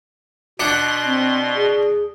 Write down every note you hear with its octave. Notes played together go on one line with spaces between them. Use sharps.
B2 D4 D5 F#5 C6
C4
G#4